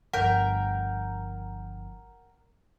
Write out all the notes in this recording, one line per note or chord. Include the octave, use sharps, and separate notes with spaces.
G1 F3 A#4 F#5 G5